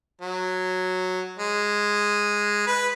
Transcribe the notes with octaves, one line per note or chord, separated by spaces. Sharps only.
F#3
G#3
B4